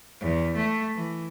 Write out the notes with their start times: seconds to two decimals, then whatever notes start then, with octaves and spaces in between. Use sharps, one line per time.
0.21 E2
0.55 A3
0.95 E3